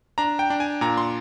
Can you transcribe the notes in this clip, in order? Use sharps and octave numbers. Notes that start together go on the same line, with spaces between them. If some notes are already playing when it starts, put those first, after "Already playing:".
D4 A#5
G5
D4
G#5
A#2 A#5
C6